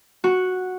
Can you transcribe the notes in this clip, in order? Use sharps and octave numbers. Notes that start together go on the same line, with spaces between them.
F#4